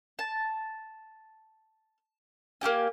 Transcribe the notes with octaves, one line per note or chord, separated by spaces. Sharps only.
A5
A#3 E4 G4 G#5